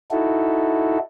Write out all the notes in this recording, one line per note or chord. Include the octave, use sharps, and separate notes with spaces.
D#4 E4 F#4 A4